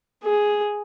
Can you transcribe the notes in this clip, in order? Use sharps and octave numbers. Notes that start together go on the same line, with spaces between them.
G#4